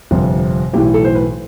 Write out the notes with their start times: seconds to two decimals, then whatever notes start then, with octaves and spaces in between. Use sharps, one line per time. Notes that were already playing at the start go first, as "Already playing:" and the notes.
0.11 G1 F2 C3
0.73 B1 A2 E3 G4
0.94 A4
1.05 C5
1.15 B4